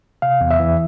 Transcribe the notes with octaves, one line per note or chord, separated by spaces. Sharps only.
C3 F5
E2
E5
E3